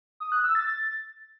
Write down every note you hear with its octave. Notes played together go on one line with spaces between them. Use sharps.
D#6
F#6
E6
A6